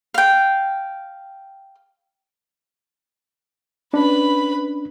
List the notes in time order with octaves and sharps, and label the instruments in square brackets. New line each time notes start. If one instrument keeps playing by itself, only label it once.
[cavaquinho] F5 G5
[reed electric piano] C#4 D4 [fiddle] B4 B5